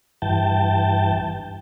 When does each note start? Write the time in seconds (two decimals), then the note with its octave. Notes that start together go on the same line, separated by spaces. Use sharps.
0.22 G2 E3 G5 A5